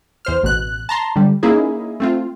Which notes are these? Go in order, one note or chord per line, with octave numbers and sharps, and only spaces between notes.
E2 C5 F6
A1 B2 F#6
A5 A#5 C6
D3 G3
A#3 C#4 D#4 E4 G#4
A3 C4 F4